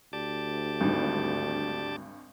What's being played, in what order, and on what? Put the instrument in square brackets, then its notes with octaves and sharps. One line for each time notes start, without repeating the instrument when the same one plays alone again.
[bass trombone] D2 [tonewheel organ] G4 D5 A5
[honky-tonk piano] G#1 G2